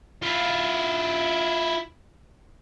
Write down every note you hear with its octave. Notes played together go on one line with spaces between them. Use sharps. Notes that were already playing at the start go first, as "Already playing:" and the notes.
E4 F4